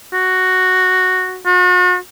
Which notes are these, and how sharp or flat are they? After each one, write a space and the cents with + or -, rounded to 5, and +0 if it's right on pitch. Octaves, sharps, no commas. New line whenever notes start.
F#4 +0
F#4 -40